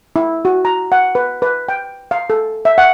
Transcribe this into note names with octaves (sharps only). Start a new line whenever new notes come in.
E4
F#4
A#5
F#5
B4
B4
G5
F5
A4
E5
F#5